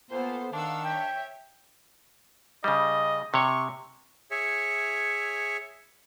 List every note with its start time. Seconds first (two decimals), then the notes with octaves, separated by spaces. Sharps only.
0.11 A#2 B3 A4 C5
0.53 D#3 D4 F5 F#5 E6
0.85 C#5 E5 G5
2.64 C#3 G3 D#5
3.34 C3 C#5 C#6
4.31 G#4 C#5 E5